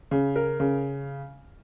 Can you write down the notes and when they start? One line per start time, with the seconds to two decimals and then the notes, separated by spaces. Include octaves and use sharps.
0.11 C#3
0.36 A#4
0.60 C#3